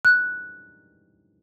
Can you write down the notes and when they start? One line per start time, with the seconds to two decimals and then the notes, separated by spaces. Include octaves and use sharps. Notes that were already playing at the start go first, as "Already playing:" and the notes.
0.05 F#6